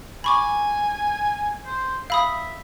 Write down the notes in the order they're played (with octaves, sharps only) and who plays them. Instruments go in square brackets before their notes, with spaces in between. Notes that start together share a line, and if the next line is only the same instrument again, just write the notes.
[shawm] G#5 [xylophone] B5 C#6 D6
[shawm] C5
[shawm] E5 [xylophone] F5 B5 D#6